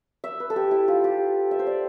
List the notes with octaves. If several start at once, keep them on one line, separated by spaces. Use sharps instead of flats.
E5
B4
A4
G4
E4
F4
G4
E5
C5
D5